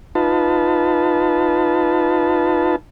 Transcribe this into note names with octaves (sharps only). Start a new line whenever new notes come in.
D#4 F4 B4 A5